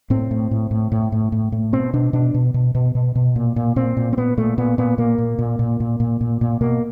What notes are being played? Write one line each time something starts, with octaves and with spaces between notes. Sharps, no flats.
A2 C4
A2
A2
A2
A2
A2
A2
A2
B2 C4
B2 D4
B2 D4
B2
B2
B2
B2
B2
A#2
A#2
A#2 C4
A#2
C4
A#2 B3
A#2 A3
A#2 B3
A#2 B3
A#2 A#3
A#2
A#2
A#2
A#2
A#2
A#2
A#2
B2 A#3